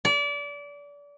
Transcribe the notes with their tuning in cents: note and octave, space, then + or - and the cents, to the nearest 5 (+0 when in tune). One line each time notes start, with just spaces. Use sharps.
D5 -30